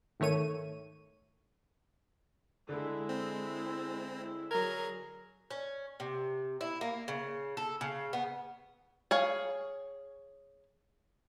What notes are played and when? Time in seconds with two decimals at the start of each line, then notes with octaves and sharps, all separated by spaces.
0.20 G#1 D#3 A3 C#5 D#7
2.69 D3 G#3 E4
3.09 C4
4.51 F#3 G#4 A#4 G#6
5.51 C#4
6.00 C3
6.61 E4
6.81 A#3
7.08 C#3
7.57 A4
7.81 C#3
8.13 B3
9.11 G#4 C#5 F5